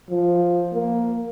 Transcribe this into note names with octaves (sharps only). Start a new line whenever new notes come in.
F3
A#3